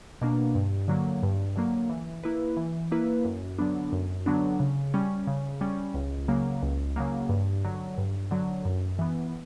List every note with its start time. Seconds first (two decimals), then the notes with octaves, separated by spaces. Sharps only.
0.21 B2 A#3 D4
0.55 G2
0.88 D3 F#3 A#3
1.23 G2
1.55 D3 F#3 A#3
1.89 E3
2.23 A#3 E4 B4
2.57 E3
2.91 A#3 E4 B4
3.25 F#2
3.59 D3 F#3 B3 D4
3.92 F#2
4.26 D3 F#3 B3 D4
4.60 C#3
4.94 G3 C#4
5.27 C#3
5.61 G3 C#4
5.94 C#2
6.28 C#3 F#3 A#3
6.63 C#2
6.96 C#3 F#3 A#3
7.29 G2
7.64 D3 F#3
7.98 G2
8.31 D3 F#3
8.65 F#2
8.99 E3 B3